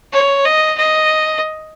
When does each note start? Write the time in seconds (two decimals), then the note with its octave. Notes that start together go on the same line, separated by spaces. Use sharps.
0.12 C#5
0.45 D#5
0.78 D#5